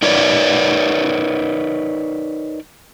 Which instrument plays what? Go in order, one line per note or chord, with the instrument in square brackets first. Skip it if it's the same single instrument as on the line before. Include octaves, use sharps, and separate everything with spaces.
[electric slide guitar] D#4 A#4 B4 C#5 D5